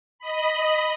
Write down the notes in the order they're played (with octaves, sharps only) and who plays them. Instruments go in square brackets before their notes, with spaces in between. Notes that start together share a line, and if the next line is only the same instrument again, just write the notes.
[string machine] D#5 B5